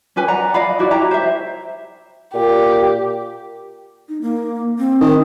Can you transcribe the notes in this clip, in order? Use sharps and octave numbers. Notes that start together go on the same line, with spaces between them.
C#4 G4 B4 G#5
D5 F#5 A#5
D5 D#5 F5 B5
D#4 E4 F#4 D5
E4 G4 A#5
C5 E5
A#2 G4
D#4
A#3
C4
D#3